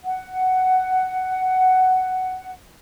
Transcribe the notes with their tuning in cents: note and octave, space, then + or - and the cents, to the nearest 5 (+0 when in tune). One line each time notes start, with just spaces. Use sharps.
F#5 +10